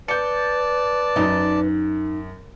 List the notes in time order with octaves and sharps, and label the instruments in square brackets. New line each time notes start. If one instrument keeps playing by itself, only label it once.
[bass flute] B4 [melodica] D5 A5 [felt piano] G6 C#7
[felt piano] F#2 [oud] D#4